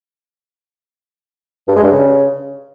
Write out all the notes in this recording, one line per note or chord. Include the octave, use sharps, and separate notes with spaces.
G2
G#3
G2
C#3